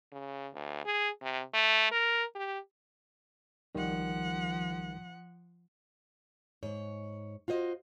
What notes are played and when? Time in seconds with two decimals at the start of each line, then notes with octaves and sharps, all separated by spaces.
0.12 C#3
0.54 D2
0.85 G#4
1.22 C3
1.54 A3
1.92 A#4
2.35 G4
3.75 C2 D#3 F3 G3 F#5
6.63 G#2 C#5
7.48 F4 F#4 C5 D#5